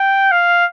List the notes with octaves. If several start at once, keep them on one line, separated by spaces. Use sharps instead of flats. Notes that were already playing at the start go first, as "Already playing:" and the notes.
Already playing: G5
F5